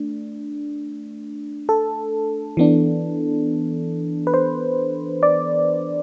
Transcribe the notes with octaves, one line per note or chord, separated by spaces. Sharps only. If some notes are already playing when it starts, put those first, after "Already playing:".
Already playing: A3 D4
A4
E3 B3 D4
B4
C5
D5